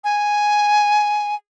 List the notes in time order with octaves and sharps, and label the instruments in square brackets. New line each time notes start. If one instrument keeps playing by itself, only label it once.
[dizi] G#5